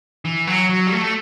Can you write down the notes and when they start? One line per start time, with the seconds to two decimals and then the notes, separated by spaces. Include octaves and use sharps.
0.25 E3
0.47 F#3
0.69 F#3
0.87 G3
0.92 A3